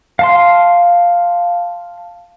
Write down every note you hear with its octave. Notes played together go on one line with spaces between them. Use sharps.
F5 A5 C6